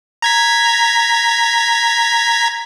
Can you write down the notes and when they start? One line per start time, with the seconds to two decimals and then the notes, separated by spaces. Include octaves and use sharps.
0.22 A#5 G#6 B6